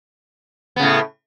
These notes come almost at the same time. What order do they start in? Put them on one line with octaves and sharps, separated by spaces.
B3 C#3 A2